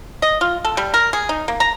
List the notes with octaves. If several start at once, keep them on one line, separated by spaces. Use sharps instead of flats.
D#5
F4
A4
G3
A#4
G#4
D#4
A#3
A#5